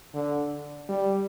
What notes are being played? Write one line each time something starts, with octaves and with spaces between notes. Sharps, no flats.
D3
G3